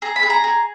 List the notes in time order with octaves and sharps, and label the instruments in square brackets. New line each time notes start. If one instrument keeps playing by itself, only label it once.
[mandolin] G#4 A#5
B5
G#4
A#5
G#4